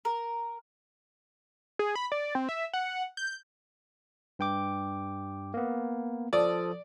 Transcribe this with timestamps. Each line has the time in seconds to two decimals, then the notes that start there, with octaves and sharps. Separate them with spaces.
0.05 A#4
1.79 G#4
1.95 B5
2.12 D5
2.35 C4
2.49 E5
2.73 F#5
3.17 G6
4.39 G2 G5 D6
5.54 A#3 B3
6.33 F3 A4 D5 D#6